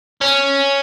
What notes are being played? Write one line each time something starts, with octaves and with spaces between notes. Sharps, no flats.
C#4